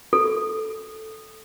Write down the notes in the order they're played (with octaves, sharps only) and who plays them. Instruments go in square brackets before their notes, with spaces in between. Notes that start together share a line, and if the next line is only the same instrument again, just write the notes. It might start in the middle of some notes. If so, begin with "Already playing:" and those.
[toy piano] A4